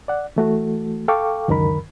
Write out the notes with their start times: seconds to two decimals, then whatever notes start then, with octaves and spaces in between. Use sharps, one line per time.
0.08 D5 F#5
0.36 E3 A3 F#4 A4
1.08 A4 F5 G5 C#6 D6
1.48 C#2 F#2 D3 D#3 A#4 B5